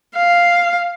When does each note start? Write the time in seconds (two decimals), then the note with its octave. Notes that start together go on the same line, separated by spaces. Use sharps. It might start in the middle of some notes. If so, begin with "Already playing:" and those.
0.16 F5